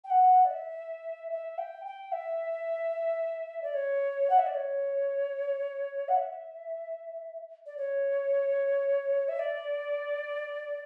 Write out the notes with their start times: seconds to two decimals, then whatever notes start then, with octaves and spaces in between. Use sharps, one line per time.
0.04 G5
0.10 F#5
0.45 D5
0.50 E5
1.31 E5
1.58 G5
1.85 G5
2.12 E5
3.62 D5
3.74 C#5
4.30 F#5
4.38 E5
4.46 D5
4.54 C#5
6.08 F#5
6.16 E5
7.66 D5
7.77 C#5
9.28 E5
9.39 D5